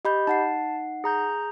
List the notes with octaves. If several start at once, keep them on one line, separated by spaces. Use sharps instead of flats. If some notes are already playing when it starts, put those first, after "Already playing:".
G4 D#5 B5 G6
D#4 F#5 A5 C7
G#4 A#5 G6